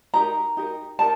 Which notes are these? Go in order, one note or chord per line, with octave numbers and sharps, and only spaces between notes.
D#4 G4 A#4 A#5
D#4 G4 A#4
D#4 G4 A#4 A5